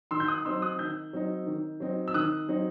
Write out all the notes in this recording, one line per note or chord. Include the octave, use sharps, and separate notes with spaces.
D#3 C6 E6
G6
D#6 F#6
F#3 C4 D#4 C6 E6
D#6 F#6
D#3 E6 G6
F#3 C4 D#4
D#3
F#3 C4 D#4
E6
D#3 D#6 F#6
F#3 C4 D#4